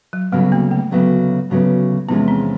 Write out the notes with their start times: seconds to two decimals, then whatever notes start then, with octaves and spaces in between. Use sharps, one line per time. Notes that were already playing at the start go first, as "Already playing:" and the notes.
0.13 F#3
0.32 D2 C#3 F#3 G3 B3
0.52 A#3
0.71 A3
0.91 D2 C#3 F#3 B3
1.50 D2 C#3 F#3 B3
2.08 E2 C3 F3 G#3 B3 C#4
2.28 C4